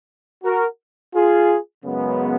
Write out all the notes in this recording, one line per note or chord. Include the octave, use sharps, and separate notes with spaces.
F#4 A#4
F4 G#4
F#2 C#3 G#3 B3